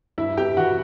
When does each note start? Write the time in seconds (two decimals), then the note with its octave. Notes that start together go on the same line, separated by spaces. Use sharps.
0.18 G2 E4 E5
0.37 B3 G4 G5
0.57 E3 F#4 F#5